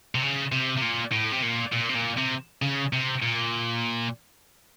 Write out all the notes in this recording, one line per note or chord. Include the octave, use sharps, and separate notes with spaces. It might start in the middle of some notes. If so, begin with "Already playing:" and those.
C3
C#3
C3
C3
A#2
A2
C3
A#2
A#2
C3
A#2
C3
C#3
C3
A#2